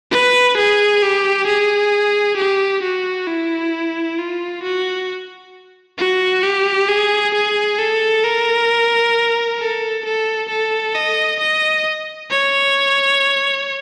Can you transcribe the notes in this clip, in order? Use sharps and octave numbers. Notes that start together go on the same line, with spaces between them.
B4
G#4
G4
G#4
G4
F#4
E4
F4
F#4
F#4
G4
G#4
G#4
A4
A#4
A4
A4
A4
D#5
D#5
C#5